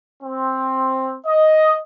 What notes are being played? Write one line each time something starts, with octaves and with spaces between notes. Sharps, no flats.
C4
D#5